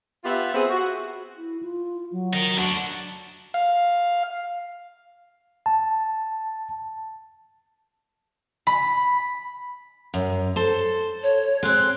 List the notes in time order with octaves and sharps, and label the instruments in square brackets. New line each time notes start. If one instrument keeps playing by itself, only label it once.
[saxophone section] B3 F4 G4 E5
B3 C4 G4 G#4
F#4
[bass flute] E4
F4
F#3
[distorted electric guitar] D#4 A#4
D4 F#4
[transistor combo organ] F5
[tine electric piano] A5
[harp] B5
[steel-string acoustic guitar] F#2
A4 C5
[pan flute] C#5
[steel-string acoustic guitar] G#3 C4 [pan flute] F#6